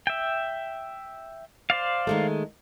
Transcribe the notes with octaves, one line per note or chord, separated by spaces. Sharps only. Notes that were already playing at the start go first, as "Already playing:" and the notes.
E5 G5
C5 D5 F5
D#3 G#3 A3